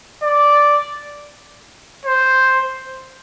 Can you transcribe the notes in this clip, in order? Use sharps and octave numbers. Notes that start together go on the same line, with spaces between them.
D5
C5